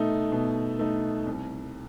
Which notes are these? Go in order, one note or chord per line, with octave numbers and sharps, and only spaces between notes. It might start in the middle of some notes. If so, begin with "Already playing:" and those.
Already playing: B2 A3 D#4
B2
A3 D#4
C2